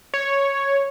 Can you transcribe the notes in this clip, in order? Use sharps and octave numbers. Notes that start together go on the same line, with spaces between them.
C#5